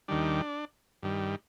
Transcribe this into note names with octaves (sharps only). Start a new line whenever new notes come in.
D#2 D#3 G3 D4
G2 D#3 G3